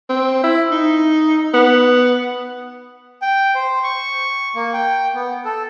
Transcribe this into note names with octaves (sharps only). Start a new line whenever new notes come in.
C4
E4
D#4
B3
G5
C5
C#6
A#3
G5
B3
A4